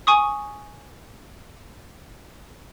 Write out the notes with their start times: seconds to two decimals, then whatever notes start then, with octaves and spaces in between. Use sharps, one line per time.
0.07 G#5 C#6 D#6